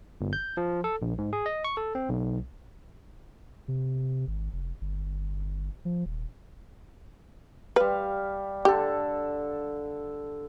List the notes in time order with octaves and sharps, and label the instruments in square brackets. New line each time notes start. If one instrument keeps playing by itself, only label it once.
[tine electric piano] G1
G6
F3
A4
A#1
G#2
G#4
D#5
C#6
A4
C4
B1
[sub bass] C3
G#1
F1
G1
F3
D#1
[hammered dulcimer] G3 F5 [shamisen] B4
[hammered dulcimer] D3 A4 [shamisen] G4